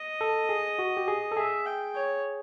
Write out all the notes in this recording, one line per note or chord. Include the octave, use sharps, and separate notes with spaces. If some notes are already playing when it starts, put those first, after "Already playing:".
Already playing: D#5
A4
G#4
F#4
G4
G#4
A4
G#4 E5
G5
C#5